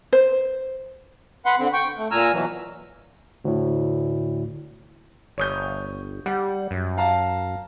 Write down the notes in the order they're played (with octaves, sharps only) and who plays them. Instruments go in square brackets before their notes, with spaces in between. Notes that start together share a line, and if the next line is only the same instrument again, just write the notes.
[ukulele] C5
[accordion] B4 F#5 C6
D3 C4
G5 C#6
A3
A#2 G#5 A#5 E6 F6
B2 E3 F#3
[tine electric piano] D2 A2
[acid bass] G1 [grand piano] C#5 D#6 G6
[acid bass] G3 [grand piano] F#5
[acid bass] F#2
[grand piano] F5 A5 A#5